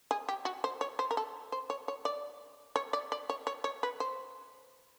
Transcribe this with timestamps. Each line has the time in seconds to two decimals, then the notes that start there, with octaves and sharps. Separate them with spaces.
0.11 G#4
0.29 G4
0.45 F#4
0.64 C5
0.81 C#5
0.99 C5
1.11 A#4
1.17 A4
1.52 C5
1.70 C#5
1.88 C#5
2.05 D5
2.76 C#5
2.93 D5
3.12 D5
3.30 C#5
3.47 C#5
3.64 C#5
3.83 B4
4.00 C5